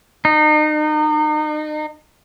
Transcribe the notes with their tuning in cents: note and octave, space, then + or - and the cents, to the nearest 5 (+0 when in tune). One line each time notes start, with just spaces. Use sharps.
D#4 -35